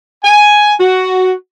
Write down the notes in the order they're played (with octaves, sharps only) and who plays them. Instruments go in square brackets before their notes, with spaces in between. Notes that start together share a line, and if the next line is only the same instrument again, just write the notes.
[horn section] G#5
F#4